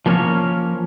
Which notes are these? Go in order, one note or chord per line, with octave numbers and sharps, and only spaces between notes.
F3 A#3 B3 C#4 A#4 C#5